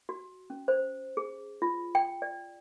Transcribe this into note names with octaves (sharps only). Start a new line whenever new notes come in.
F#4
C#4
C5
G#4
F4
G5
D5